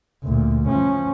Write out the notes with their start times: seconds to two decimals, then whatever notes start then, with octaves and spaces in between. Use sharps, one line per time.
0.23 D2 A#2
0.68 F3 C#4